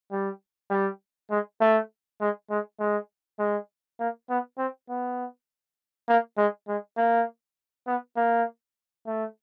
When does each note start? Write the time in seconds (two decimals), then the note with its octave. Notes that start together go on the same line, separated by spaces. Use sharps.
0.12 G3
0.70 G3
1.30 G#3
1.61 A3
2.21 G#3
2.50 G#3
2.79 G#3
3.39 G#3
3.99 A#3
4.30 B3
4.58 C4
4.89 B3
6.09 A#3
6.38 G#3
6.68 G#3
6.97 A#3
7.87 B3
8.17 A#3
9.07 A3